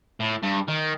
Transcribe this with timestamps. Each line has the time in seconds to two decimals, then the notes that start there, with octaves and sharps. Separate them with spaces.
0.20 A2
0.43 G2
0.68 D#3